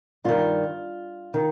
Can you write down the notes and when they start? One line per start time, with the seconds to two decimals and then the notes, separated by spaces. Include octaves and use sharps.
0.24 G2 D#3 F4
1.34 D#3